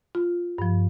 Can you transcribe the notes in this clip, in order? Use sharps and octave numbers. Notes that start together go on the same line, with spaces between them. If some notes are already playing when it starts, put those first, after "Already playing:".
F4
G2 F3